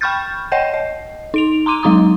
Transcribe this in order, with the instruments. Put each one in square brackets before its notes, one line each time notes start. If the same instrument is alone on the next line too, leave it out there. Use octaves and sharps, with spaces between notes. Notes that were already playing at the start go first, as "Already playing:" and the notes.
[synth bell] G5 B5 C#6 F6 G6 A6
C#5 D#5 F#5 G5 G6
D#5
D#4 D7 F7
A#5 C6 D6 D#7
F#3 G#3 D#4 A#5 D6 D#6